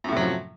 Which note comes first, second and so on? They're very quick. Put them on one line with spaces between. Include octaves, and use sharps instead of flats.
F#2 A2 C3 F#3 F3